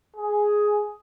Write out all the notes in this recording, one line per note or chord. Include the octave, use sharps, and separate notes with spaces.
G#4